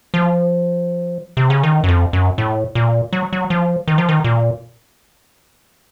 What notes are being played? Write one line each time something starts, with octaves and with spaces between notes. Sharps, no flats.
F3
C3
C#3
D#3
F#2
F2
F#2
A2
A#2
F#3
F#3
F3
D#3
F3
D#3
A#2